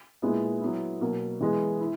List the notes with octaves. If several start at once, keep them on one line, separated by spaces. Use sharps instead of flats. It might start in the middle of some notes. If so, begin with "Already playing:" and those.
A#2 G#3 B3 E4
F#3 B3 E4
B2 F#3 A#3
E3 G#3 B3
E4